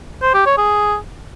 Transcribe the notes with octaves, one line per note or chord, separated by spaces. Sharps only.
C5
G4
C#5
G#4